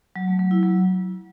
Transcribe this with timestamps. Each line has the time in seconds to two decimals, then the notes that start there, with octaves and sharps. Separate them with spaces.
0.16 F#3
0.27 A3
0.39 F#3
0.51 E4
0.63 F#3